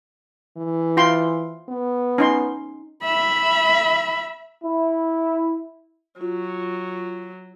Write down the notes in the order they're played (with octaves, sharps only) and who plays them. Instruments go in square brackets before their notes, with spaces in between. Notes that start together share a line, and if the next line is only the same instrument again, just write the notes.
[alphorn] E3
[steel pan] F4 G5 C6
[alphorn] B3
[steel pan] C#4 D#4 C6
[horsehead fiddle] E5 B5
[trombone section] E4
[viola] F#3 [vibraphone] F4